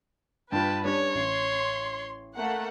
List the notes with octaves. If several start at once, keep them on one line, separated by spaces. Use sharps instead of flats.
G2 F4 B4 G5 A5
G3 C#4 D4 C#5
A1 C6
A3 A#3 F#5